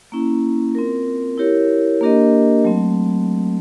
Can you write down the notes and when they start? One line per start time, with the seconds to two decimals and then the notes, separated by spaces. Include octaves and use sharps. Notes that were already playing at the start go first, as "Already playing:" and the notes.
0.12 A#3 C#4 E4
0.75 C4 F4 A#4
1.38 E4 G4 A#4 C#5
2.01 A#3 D4 G4 A#4 D#5
2.64 F#3 A3 C4